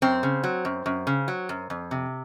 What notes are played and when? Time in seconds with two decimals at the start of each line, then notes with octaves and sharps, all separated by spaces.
0.02 F#2 C4
0.23 C#3
0.44 F#3
0.65 F#2
0.86 F#2
1.07 C#3
1.28 F#3
1.49 F#2
1.70 F2
1.91 C3